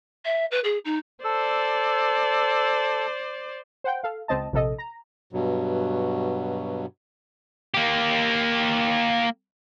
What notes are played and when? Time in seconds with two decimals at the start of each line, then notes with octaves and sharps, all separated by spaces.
0.25 E5
0.51 B4
0.64 G#4
0.85 D#4
1.24 A4 C5 D5 E6
3.84 C5 F#5 G5
4.03 A4 F5
4.28 C#2 C4 D#5 A5
4.53 A#1 C3 A4 D#5
4.78 A#5
5.33 G2 B2 F#3
7.74 A#3 G4